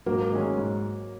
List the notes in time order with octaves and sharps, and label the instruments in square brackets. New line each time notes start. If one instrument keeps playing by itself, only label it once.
[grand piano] G#2 [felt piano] F#3 A#3
[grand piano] D#3 G#3 C#4 G#4
G#2